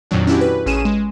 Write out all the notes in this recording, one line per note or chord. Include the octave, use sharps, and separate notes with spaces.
F2 A#2 D#3 F#3 D4
C#4 D4 E4 F#4 G4
B4
A1 C#4 G#4 D#7 E7
G#3